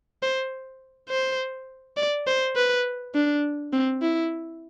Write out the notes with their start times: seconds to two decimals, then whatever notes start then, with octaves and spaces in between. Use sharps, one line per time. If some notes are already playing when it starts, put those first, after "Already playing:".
0.23 C5
1.10 C5
1.97 D5
2.27 C5
2.56 B4
3.15 D4
3.73 C4
4.02 E4